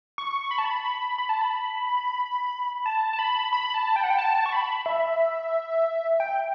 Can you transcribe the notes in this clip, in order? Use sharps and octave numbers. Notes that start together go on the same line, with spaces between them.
C#6
B5
A5
B5
B5
B5
A5
B5
A5
A5
B5
B5
A5
G5
F#5
G5
A5
C#6
B5
E5
G5